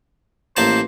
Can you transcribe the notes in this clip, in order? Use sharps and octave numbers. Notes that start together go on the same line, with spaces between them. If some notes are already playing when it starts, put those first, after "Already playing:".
A1 A#3 C5 A5